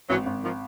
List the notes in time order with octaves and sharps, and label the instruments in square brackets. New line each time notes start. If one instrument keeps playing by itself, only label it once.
[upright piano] G#1 [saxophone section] E3 F#3
[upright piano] G#1
[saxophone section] D#3 F3